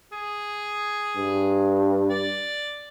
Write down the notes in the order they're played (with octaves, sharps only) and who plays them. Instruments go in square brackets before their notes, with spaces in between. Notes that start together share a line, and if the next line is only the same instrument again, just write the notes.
[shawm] G#4
[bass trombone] G2
[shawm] D5